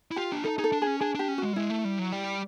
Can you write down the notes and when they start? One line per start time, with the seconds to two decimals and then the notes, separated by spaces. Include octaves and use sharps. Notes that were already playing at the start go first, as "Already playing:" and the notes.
0.11 E4
0.16 F4 G4
0.33 D4
0.44 D#4 A4
0.58 D#4 G#4
0.64 A4
0.72 D4
0.82 G#4
0.87 C#4
1.00 D4 G#4
1.15 D4 G4
1.28 C#4
1.38 G#3 F#4
1.53 G3
1.56 G#3 E4
1.70 A3
1.85 G3
1.99 F#3
2.12 G3